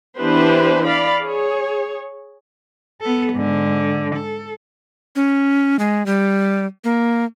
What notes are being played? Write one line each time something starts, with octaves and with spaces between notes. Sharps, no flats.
E3 B3 D4 G4 B4 C5
D5 F5 B5
G#4 C#5
B3 A4
G#2 D3
A4
C#4
G#3
G3
A#3